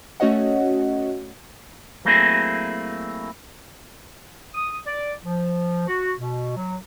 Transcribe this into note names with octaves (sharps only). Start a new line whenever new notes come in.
A3 C#4 F#4 C#5 D#5 F#5
F#3 A3 A#3 C4 E4 G#4
D#6
D5
F3
F#4
B2
F#3